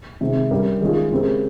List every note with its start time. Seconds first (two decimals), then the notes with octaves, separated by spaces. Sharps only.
0.21 C3 D#3 G#3 C4
0.51 G2 G3 C#4 G4 A#4
0.81 D#3 G#3 C#4 F4 G#4
1.11 C#3 G#3 C4 G4 A#4